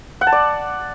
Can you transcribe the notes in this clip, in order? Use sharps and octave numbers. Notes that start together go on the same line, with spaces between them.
F#5
A5
D5